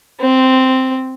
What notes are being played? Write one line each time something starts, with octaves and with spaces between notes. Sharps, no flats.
C4